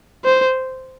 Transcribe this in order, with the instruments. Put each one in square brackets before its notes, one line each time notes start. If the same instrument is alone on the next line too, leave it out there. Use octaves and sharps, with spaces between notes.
[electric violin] C5